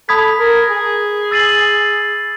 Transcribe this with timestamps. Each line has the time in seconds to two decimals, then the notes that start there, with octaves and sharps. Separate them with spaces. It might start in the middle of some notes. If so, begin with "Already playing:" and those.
0.09 A4 B5 D#6 G#6 B6
0.39 A#4
0.70 G#4
1.31 E6 A6 C7 D#7 F#7